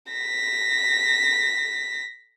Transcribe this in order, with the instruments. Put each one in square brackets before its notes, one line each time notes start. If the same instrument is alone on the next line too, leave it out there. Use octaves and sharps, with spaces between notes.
[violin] A#6 B6